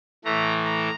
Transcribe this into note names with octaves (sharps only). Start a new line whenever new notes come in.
A2 E3 A3 A#5
A#5